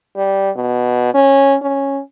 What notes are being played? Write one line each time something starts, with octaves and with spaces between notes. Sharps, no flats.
G3
B2
C#4
C#4